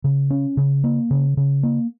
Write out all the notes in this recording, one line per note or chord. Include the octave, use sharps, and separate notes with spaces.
C#3
C#4
C#3
A#3
C#3
C#3
A#3